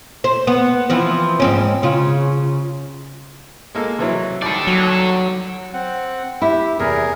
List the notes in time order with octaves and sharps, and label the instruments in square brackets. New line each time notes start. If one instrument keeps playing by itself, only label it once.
[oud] C5
B3
E3 F3 C4
G#2 C4 C#4
C#3 F4
[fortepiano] G#3 A#3 A4
C3 E3 F#3
[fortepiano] D#2 G3 [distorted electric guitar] A4 D5
[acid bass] F#3
[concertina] C4 F#5
[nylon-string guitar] E4 [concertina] G4
[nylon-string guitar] E2 C3 [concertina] G#4 A#4